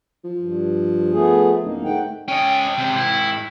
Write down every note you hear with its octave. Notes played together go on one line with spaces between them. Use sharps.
F3
G2
A3 B3 G#4
D1 A#3 D#4
G#2 A3 F#5 G5
G#2 C#4 D#5 G5
C3 C5
E4